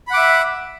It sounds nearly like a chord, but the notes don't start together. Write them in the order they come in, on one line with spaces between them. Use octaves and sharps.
B5 F#5 D6 E5